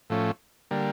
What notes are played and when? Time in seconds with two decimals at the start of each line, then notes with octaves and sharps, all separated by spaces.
0.10 A2 F3 A3 C#4
0.71 D3 G3 A#3